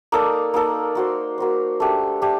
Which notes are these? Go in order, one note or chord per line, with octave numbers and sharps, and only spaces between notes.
A#3 D#4 A4 D5
A#3 D#4 A4 D5
A#3 F#4 C5
A#3 F#4 C5
A3 D4 G4
A3 D4 G4